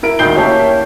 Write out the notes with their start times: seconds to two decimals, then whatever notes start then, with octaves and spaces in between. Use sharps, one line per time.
0.03 E4 A#4 D7
0.19 E1 D2 D#3 G6 C7 G7
0.35 A#3 C#4 E4 G4 C#5 A5